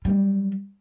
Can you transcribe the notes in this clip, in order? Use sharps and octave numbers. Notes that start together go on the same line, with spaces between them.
F#3 G3